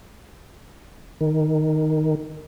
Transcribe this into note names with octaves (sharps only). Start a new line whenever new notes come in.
D#3